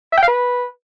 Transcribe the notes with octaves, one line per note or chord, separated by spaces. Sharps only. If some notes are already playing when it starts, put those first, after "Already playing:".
E5
G5
F5
B4